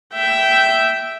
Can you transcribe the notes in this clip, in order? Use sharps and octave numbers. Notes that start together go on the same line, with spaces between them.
E5 G5